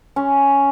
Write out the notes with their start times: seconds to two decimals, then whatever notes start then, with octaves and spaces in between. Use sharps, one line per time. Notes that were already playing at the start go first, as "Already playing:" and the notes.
0.16 C#4